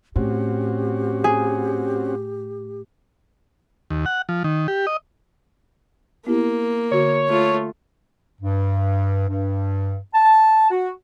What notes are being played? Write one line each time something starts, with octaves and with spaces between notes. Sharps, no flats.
A2 C4 C#4 F#4 G4
G#4
D#2
F#5
F3
D#3
G4
D#5
A#3 B3 E4 G4
D3 F#4 C#5
A3 F4
G2
G2
A5
F#4